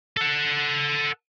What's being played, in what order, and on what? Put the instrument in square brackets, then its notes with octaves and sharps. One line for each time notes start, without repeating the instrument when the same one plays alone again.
[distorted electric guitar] A4 F#5